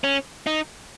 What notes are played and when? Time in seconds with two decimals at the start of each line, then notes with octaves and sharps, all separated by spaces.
0.04 C#4
0.47 D#4